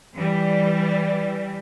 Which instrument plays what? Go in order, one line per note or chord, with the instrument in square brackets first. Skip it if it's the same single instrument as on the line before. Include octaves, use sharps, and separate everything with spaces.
[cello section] E3 G3